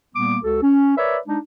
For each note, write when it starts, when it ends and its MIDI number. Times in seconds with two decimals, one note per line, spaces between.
0.15 0.37 46
0.15 0.37 55
0.15 0.37 58
0.15 0.37 59
0.15 0.37 86
0.43 0.57 37
0.43 0.57 66
0.43 0.57 69
0.63 0.95 61
0.97 1.18 70
0.97 1.18 71
0.97 1.18 73
0.97 1.18 74
0.97 1.18 76
1.28 1.38 56
1.28 1.38 62
1.28 1.38 63